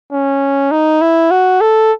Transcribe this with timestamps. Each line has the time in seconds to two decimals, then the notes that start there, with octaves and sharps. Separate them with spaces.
0.13 C#4
0.71 D#4
1.01 E4
1.31 F#4
1.61 A4